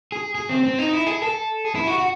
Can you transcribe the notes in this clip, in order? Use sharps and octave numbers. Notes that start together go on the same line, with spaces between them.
G#4
G#4
C4
C4
D#4
E4
G#4
A4
G#4
E4
F#4
F#4